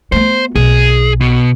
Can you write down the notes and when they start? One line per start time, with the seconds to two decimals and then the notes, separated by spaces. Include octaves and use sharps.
0.12 A3 B3 C5
0.56 B1 G#4
1.21 B2